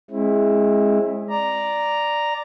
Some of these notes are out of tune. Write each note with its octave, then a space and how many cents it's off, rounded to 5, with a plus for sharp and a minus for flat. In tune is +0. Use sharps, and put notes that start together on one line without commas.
G#3 +0 C4 +40 E4 +0
D5 +0 A#5 +0